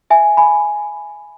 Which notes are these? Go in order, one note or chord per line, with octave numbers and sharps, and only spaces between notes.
E5 G#5
G#5 B5